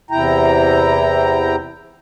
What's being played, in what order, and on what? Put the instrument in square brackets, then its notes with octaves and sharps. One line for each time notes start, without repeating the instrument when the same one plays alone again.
[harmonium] E2 C3 E4 G5 A#5